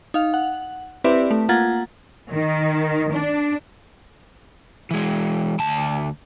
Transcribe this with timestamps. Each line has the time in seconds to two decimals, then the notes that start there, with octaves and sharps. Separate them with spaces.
0.14 D#4 F5
0.34 F#5
1.04 C4 E4 G4 B4 D5 E5
1.31 A3
1.49 A#3 F4 F#5 A#5 G#6 A6
2.32 D#3
3.13 D4
4.91 E3 G#3
5.59 D2 A5